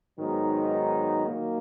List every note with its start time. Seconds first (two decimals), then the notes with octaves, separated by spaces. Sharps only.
0.19 G#2 D#3 F#3 B3 D#4
1.28 D#3 F#3 A#3